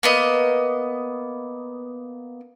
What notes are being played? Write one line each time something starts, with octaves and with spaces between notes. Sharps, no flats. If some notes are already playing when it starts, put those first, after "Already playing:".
A#3 B3 D#5